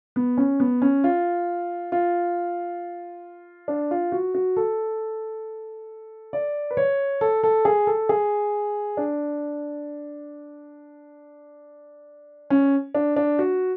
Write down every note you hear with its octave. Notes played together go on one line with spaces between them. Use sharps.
B3
C#4
B3
C#4
F4
F4
D4
F4
F#4
F#4
A4
D5
B4
C#5
A4
A4
G#4
A4
G#4
D4
C#4
D4
D4
F#4